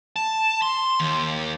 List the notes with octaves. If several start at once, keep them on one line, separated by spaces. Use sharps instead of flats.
A5
C6
D#2